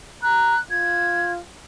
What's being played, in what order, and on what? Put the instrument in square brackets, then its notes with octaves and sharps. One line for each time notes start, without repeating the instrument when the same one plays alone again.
[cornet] A#5 [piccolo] F#6
[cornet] F4 [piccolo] G#6